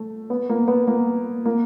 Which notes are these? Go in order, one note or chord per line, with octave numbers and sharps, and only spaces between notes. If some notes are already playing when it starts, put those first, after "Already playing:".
Already playing: A3
B3
A#3
B3
A#3
A#3